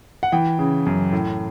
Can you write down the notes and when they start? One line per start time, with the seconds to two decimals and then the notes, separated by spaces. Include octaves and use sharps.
0.23 F#5
0.32 E3 G5
0.59 C#3
0.86 F#2
1.12 A2